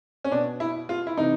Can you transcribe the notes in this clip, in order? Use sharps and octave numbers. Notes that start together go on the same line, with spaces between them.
C#4
B2 D4
E4
F4
E4
C3 E3 D#4